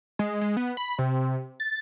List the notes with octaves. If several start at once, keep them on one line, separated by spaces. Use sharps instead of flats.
G#3
G#3
B3
B5
C3
A6